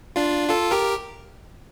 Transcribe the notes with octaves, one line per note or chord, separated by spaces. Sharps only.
D4 F4
F4 A4
G4 A#4